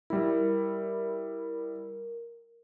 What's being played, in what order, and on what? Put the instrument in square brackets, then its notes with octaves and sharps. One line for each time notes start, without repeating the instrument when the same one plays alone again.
[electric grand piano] G3 E4 [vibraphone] A#4